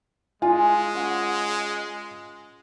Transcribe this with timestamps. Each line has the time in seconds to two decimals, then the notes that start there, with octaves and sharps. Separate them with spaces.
0.42 G#3 F4 G#5
0.94 C#4 B4 F#5